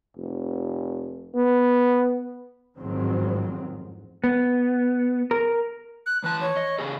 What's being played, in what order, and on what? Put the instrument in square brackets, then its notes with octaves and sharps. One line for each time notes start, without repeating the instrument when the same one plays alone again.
[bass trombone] F1
B3
[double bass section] A1 F2 G#2 D#3 F#3 C4
[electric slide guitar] B3
A#4
[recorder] F#6
[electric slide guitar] E3 A5 [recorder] F#6
[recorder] C#5
[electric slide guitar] D#5
C#3 G#4 A4